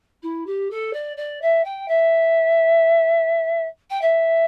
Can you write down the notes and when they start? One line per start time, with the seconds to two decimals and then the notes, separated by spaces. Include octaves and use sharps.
0.22 E4
0.46 G4
0.70 A4
0.93 D5
1.17 D5
1.41 E5
1.64 G5
1.88 E5
3.90 G5
4.01 E5